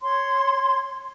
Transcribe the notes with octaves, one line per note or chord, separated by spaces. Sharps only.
C#5 C6